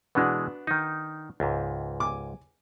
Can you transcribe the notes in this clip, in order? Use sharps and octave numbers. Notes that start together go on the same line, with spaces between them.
B2 E3 G#3 B3 D4 F#4
D#3 D#4
C#2 G#2
G#5 D6